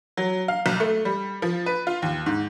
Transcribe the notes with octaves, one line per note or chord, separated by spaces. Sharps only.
F#3
F5
B1
A3
G3
F3
B4
F4
D#2
G#2